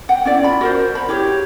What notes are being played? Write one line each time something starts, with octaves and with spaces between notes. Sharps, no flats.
F#5 G5
C#4 E4 D5
F4 B5
F#4 A#4 C5
C5 B5
E4 G4 G#4 C#5